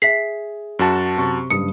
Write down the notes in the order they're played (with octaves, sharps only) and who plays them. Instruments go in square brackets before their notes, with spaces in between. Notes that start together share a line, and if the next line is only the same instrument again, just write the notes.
[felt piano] G#4 [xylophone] E5 B6 C7
[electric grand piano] F#2 F#4 A5
[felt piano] C3 C#6
[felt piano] F#1 G2 D#6 [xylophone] C#7